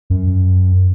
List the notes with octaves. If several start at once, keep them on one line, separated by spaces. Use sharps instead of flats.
F#2